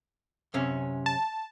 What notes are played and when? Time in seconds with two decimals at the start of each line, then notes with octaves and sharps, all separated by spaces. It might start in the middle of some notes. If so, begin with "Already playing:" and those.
0.54 F#2 C3 C#4
1.06 A5